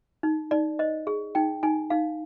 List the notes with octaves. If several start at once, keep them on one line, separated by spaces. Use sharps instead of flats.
D#4
D#4 D5
C5 D#5
G#4
D#4 G5
D#4 G#5
D#4 F5